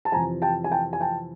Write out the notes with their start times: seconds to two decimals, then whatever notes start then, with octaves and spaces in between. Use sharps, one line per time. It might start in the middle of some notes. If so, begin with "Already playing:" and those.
0.05 A5
0.12 F2 C3 E3 G#5 A#5
0.42 G5 A5
0.64 G#5
0.72 G5 A5
0.93 G#5
1.01 G5 A5